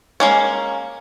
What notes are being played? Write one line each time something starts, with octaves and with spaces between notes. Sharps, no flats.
G#3 A#3 C#4